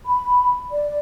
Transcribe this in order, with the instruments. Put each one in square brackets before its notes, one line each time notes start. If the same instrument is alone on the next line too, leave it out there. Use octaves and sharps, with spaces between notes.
[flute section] B5
D5